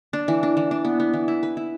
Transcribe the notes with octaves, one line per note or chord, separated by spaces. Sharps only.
D4
E3
D4
E3
D4
B3
B3
E3
E4
B4
E4